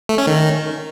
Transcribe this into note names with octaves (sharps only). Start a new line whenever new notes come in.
A3
C#4
D#3